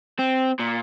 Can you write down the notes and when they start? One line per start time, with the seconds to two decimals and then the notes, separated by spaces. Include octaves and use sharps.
0.19 C4
0.60 A#2